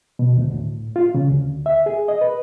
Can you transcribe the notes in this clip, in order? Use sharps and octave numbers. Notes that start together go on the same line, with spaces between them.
B2
D2
A2
F4
C#3
D2
E5
G#4
D#5
B4